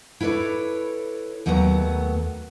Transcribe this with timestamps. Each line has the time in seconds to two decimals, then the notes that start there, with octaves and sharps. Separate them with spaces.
0.20 E4 A4 B4 C#5 D5
1.46 D#2 F#3 A3 B3 C5 A#5